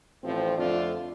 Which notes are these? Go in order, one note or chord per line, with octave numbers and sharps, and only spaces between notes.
A1 A2 F3 C4
F2 D3 A3 D4 F4